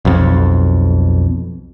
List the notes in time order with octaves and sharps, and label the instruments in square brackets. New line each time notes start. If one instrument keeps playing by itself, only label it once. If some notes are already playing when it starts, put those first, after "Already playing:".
[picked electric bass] B1 F2